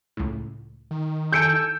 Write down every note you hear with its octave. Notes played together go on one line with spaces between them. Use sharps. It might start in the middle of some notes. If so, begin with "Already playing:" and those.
C#2 A2
D#3
A4 G#5 E6 G6 C#7 D7